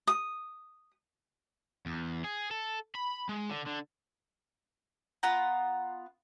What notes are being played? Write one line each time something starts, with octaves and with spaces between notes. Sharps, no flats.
D#6
E2
G#4
A4
B5
G#3
D3
D3
B3 F4 F#5 A#5